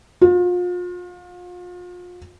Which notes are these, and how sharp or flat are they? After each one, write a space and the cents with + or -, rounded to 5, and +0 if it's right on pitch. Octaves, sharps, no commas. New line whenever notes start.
F4 +35